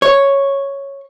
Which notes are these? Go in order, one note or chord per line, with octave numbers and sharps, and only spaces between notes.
C#5